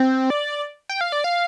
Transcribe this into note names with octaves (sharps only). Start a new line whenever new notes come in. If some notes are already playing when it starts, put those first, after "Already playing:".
Already playing: C4
D5
G5
F5
D5
F5